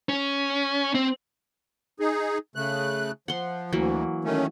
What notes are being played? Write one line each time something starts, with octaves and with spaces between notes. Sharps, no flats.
C#4
C4
D#4 G#4
C#3 A3 F#6
F3 F#5 C6
D2 E3 F#3 A#3
D#3 A3 C#4